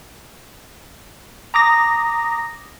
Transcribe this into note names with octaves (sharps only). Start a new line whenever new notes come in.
A#5 D6 D#6 A#6